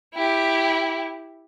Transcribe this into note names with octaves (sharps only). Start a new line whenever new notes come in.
E4 G4